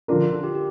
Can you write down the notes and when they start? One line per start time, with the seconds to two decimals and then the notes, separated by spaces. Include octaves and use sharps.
0.08 D3 F3 D4 F4 A#4
0.43 G4
0.55 G4